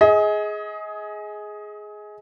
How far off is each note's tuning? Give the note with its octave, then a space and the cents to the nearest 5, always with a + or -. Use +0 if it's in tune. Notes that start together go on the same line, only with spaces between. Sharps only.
G#4 +10 D#5 +30